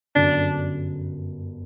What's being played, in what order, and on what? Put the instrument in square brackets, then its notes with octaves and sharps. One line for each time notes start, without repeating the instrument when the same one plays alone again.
[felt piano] G1 F#2 D3 F#3 [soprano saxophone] D4